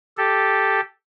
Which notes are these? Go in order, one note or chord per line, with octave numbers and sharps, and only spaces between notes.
G4 A4